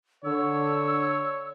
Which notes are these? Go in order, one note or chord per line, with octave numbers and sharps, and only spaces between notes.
D3 C#5 E6